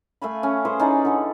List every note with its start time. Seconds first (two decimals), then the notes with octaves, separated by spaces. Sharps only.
0.22 A3 F5 G#5 B5
0.43 C#4
0.65 G#4 B4 C5
0.80 C#4 D#4 E4 D5
1.05 D3 A4